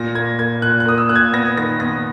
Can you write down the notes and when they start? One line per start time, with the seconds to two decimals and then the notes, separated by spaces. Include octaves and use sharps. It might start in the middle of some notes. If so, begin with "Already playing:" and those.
Already playing: A#2 A#6
0.15 A#3 G#6
0.39 A#3 G#6
0.62 A#2 F#6
0.80 F#6
0.85 A#3 D#6
0.98 E6
1.09 A#2 F#6
1.16 G#6
1.33 B3 A#6
1.57 D#3 A#6
1.80 B3 A#6